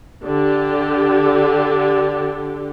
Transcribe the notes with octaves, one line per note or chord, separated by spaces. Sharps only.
D3 G4